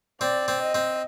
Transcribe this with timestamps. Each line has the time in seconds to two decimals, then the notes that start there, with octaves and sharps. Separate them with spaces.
0.21 C4 D5
0.48 C4
0.61 D#5
0.75 C4